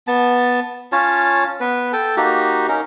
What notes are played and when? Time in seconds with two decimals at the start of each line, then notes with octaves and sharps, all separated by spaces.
0.07 B3 A5
0.92 C#4 F4 C#5 A5
1.60 B3 B4
1.93 A4 G5 A5
2.17 A#3 D#4 F#4 G4
2.68 C#4 D#4 A#4